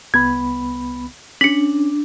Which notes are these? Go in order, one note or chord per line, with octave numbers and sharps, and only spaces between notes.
C2 B3 B5 G#6
C#4 D4 B6 C#7